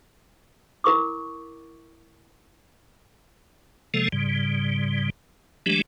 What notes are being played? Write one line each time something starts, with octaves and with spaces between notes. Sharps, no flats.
E4 A#4 C#6 D6
C3 F3 G#3 A#3 A4
G#2 C#3 G3
E3 F#3 G#3 A3 D4 G4